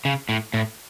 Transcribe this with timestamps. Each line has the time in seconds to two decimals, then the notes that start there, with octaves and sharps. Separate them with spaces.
0.05 C#3
0.29 A2
0.54 A2